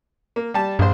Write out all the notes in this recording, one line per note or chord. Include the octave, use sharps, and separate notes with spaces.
A#3
G3 A5
A#1 G2 C5